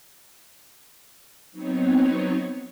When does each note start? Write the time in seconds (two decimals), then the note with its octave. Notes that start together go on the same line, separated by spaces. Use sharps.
1.51 F#3 B3 C4 D#4 C#5